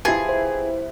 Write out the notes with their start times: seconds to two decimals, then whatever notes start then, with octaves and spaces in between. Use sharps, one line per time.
0.05 E3 F3 E4 G4 G#4
0.29 C5